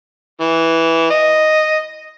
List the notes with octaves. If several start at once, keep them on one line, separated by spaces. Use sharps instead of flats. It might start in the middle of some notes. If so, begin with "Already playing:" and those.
E3
D#5